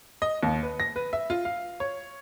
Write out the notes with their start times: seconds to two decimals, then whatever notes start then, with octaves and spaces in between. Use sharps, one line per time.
0.22 D#5
0.43 D#2
0.63 B4
0.80 A#6
0.96 B4
1.13 E5
1.30 F4
1.45 F5
1.80 C#5